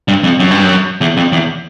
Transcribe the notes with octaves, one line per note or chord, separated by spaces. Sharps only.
G2
F2
F#2
G2
F#2
E2
F2
E2